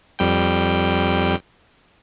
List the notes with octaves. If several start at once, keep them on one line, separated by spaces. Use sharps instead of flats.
F2 G3 G5